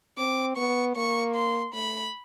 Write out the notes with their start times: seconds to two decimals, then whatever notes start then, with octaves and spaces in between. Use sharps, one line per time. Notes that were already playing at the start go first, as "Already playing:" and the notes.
0.18 C4 D6
0.57 B3 C#6
0.96 A#3 C#6
1.35 C6
1.74 A3 B5